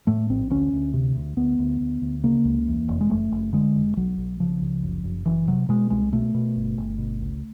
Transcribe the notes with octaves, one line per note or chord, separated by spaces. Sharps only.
A2 A3
A#1 C4
D2 C#4
D2
C3
D2
D2 B3
D2
D2
D2
C#3 A#3
C#2
E2
F1
G#3
F#1 A3
F#1
D3 G#3
F1
B1 F#3
B1
C#3 F3
C#2
F#1
F#1
F#1 E3
C3 F#3
B2 G#3
C2 G#3
B2 A3
B2
G1
G1
B2
C#2